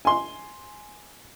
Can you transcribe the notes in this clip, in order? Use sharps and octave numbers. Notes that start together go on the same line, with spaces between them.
G#5 C6